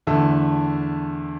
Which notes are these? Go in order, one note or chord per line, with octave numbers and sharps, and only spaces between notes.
E2 D3 A3 E5